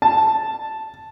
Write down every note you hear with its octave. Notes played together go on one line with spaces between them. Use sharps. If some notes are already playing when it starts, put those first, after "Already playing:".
A5